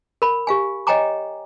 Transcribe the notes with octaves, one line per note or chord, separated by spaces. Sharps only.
A#4 B5
G4 F5 G#5
C#5 D#5 G5 G#5 A#5 D6